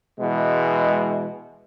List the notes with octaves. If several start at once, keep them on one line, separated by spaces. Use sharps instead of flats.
B2 E3 G#3